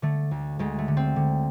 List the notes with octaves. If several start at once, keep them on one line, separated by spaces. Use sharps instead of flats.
D3 A3
D2
D2 G#3
A3
D3
C4
D3